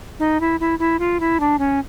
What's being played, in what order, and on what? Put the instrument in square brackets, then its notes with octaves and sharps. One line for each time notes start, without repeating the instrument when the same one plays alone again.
[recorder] D#4
E4
E4
E4
F4
E4
D4
C#4